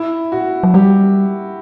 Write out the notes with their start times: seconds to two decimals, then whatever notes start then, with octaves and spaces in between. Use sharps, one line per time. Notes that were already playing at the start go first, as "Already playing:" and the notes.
Already playing: E4
0.32 F#4
0.63 F#3
0.74 G3 G4